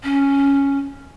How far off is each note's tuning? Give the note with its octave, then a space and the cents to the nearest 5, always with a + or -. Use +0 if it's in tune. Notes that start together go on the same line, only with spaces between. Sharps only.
C#4 +0